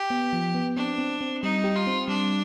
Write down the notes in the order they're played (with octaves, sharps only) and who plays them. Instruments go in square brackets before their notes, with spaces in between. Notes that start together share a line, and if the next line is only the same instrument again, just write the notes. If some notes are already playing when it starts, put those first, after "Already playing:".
Already playing: [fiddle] G4
[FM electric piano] B3
F3
B3
[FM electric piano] C4 [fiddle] D4
[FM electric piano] C4
C4
[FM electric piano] G3 [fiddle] D#4
[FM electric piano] G4
[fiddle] F4
[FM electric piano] C4
[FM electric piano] G3 [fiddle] D4